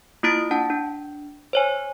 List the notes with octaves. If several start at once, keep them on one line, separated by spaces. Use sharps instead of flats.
A#3 E4 F4 D#6 A6 D7
D4 F#5 A5
D4
C5 C#5 G#5